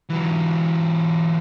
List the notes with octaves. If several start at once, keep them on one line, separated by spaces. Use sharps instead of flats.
E3 F#3